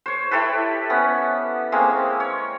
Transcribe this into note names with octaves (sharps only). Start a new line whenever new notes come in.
C5 C#5
E4 G4 A4 B4
B3 C#4
G#3 A#3 C4 C#4
C#5